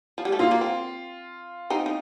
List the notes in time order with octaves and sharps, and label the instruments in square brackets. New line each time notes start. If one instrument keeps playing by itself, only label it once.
[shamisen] F3
G3
A3
[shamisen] A#3 [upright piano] F4
[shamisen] A#3
C4
C4 D#4
D#4